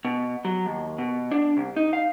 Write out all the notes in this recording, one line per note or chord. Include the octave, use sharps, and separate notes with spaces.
B2
F#3
D#2
B2
D4
C2
D#4
F5